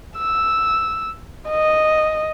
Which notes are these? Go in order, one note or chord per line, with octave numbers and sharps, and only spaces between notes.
E6
D#5